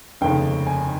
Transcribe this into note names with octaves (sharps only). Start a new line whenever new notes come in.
F1 D#2 C#3 G5
G#5